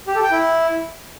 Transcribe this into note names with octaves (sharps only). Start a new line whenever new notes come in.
G4
A4
G5
E4